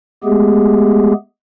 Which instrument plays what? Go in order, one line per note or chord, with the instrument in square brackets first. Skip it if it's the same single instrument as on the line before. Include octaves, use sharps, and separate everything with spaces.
[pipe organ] G#3 A3 B3 G4 G#4